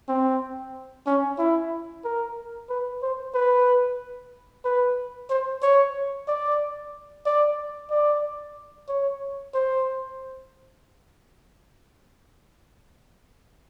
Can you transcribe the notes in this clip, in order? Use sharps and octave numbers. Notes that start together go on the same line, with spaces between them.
C4
C#4
E4
A#4
B4
C5
B4
B4
C5
C#5
D5
D5
D5
C#5
C5